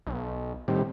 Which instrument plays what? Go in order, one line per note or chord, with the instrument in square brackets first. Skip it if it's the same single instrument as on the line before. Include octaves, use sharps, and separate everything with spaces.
[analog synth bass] B1
[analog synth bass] A2 [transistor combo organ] D#3 G3 C4